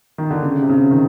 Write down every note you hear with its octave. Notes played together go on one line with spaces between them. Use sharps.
D#3
D3
C#3
C3
C#3
D#3